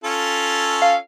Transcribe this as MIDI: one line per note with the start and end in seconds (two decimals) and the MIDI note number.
0.04 0.95 61
0.04 0.95 65
0.04 0.95 69
0.82 0.96 77